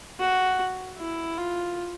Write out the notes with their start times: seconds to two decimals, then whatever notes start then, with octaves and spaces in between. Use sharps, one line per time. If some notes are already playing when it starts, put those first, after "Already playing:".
0.20 F#4
0.98 E4
1.38 F4